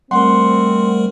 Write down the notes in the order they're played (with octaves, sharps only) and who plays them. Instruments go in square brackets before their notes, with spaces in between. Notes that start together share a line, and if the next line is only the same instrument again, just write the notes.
[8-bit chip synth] G3 A3 A#4 [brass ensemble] C4 [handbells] F#5 C6